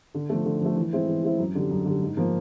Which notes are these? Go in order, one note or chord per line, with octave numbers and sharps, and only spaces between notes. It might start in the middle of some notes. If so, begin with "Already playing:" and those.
D3
F3 A3
D3
F3 A3
E3
G#3 C4 E4
E3
G#3 C4 E4
F#2
D3 G3
F#2
D3 G3
G#2
F3 A#3